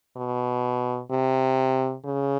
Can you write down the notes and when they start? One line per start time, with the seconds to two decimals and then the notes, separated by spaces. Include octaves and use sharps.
0.17 B2
1.11 C3
2.05 C#3